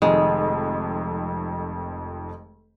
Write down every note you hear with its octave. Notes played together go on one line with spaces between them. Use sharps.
F1 F2 D#3 G#3